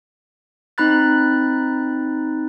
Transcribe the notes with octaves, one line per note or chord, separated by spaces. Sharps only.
C4 D#4 A#5 B5 F#6 A6